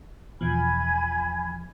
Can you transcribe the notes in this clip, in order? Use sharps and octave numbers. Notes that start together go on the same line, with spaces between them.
E2 B2 F3 G#5 B5 G#6